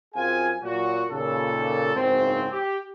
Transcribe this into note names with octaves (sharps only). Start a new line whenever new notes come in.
F#2 C4 F4 G#4 F5 G#5
A#2 F#3 F#4
D#2 A#2 C#3 A4
F#1 B1 G#2 C#3 C4
G4